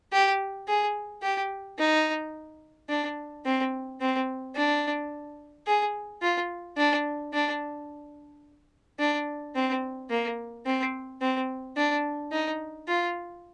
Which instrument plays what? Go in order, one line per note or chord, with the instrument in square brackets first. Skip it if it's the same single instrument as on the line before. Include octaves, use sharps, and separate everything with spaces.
[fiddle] G4
G#4
G4
D#4
D4
C4
C4
D4
G#4
F4
D4
D4
D4
C4
A#3
C4
C4
D4
D#4
F4